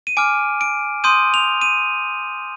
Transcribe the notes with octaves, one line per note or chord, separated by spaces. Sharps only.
D#7
G#5 D6 F6 D7
D7
C6 D#6 G6 D#7
F7
D#7